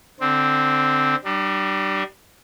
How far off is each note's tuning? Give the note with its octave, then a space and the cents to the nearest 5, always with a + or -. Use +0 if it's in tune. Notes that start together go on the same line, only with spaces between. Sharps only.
D3 +0 C4 +0
G3 -25 D4 +30